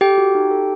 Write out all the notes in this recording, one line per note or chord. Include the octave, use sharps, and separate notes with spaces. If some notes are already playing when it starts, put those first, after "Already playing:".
G4 A4 G5
F#4
D#4
A4